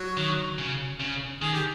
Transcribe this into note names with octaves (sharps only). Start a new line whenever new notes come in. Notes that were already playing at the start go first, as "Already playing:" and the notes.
Already playing: F#3 F#4
D#3
C#3
C#3
D#3 G#4
G4